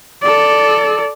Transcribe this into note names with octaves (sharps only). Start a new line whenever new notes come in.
A4 D5